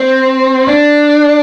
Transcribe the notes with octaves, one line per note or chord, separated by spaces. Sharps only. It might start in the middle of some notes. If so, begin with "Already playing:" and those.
Already playing: C4
D4